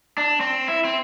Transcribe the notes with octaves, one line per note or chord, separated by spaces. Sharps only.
D4
C4
E4
C4